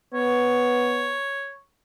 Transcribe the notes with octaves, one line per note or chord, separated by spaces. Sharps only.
B3 C#5